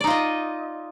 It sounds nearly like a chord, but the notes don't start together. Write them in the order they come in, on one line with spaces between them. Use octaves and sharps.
D5 D#4 F4 D#5